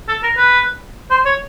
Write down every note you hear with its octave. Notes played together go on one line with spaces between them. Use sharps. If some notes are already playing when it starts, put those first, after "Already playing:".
A4
A#4
B4
C5
C#5